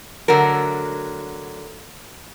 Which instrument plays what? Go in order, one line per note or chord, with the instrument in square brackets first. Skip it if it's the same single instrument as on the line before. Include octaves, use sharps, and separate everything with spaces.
[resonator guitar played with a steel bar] D3 F#3 A3 A#4